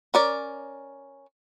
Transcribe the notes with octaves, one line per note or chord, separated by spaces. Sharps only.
C#4 A#4 D5